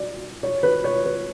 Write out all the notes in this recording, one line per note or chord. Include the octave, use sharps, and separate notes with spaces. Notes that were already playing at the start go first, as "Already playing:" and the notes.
Already playing: D5
C#5
B4
C#5
B4